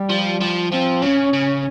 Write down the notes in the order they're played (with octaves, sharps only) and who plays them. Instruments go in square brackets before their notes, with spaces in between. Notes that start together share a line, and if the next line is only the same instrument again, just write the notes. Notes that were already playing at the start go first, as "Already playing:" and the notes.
Already playing: [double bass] G3
[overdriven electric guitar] F3
F3
[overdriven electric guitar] F3 [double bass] C4
[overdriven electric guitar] C#3 [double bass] C#4
[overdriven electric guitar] C#3